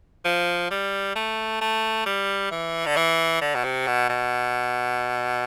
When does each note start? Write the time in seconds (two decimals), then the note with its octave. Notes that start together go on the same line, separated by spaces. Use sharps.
0.25 F3
0.71 G3
1.15 A3
1.61 A3
2.06 G3
2.51 E3
2.86 D3
2.96 E3
3.41 D3
3.55 B2
3.64 C3
3.87 B2
4.09 B2